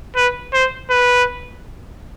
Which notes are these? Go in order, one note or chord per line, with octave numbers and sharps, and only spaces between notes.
B4
C5
B4